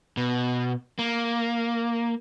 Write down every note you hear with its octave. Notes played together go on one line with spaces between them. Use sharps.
B2
A#3